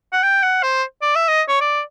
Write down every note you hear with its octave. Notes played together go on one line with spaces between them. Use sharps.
F#5
G5
F#5
C5
D5
E5
D#5
C#5
D5